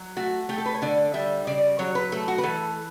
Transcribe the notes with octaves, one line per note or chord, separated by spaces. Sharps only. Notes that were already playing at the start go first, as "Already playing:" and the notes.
Already playing: F#3
A3 F#4
A3 G4
A4
B4
C#5
D3 D5
G3 E5
C#3 D5
F#3 C#5
B4
A3 A4
F#4
B4
E3 A4